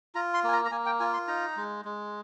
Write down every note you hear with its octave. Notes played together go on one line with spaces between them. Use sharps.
F4 A#5
C6
A#3 G#5
A#5
A#5
A#3 G#5
G5
F4 G#5
C6
D#4 A#5
G#3
G#3